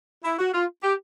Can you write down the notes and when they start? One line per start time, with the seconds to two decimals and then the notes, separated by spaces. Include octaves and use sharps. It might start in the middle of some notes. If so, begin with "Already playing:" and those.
0.24 E4
0.39 F#4
0.54 F4
0.83 G4